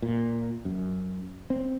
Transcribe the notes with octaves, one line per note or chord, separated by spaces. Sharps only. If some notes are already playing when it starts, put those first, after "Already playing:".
A#2
F#2
C4